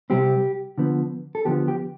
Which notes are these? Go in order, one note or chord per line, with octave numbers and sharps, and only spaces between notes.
C3 G3 C4 G4
D3 F3 B3
A4
D3 F3 B3 G4
G4